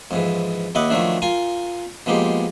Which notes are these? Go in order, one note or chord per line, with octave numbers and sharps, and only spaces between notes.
F2 G#2 E3
D#2 E4 D#5 F#5 D6
D#3 F3 F#3 A3 D4 E4
F4 A#4 G#5
B2 F3 G#3 A#3 G4